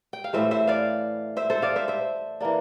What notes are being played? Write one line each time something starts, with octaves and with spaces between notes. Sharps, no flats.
G5
F5
A2 E3 A3 C5 E5
C5 E5
D5 F5
C5 E5
A4 C5
D5 F5
C5 E5
C5 E5
E3 A#3 D4